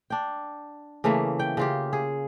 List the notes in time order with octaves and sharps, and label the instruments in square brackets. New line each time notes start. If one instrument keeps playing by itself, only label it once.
[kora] D4 G5
C#3 E3 A3 A#3
G5
C#3 F4 G4
G#4